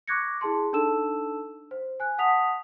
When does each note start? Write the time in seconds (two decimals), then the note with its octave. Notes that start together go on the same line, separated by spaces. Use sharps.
0.08 C#6 D6 F#6 G#6 A#6 C#7
0.41 E4 G#4 A5 C6
0.73 D4 D#4 A4 A5 E6 E7
1.71 C5
2.00 G#5 F#6
2.18 F#5 A5 D#6 B6 F7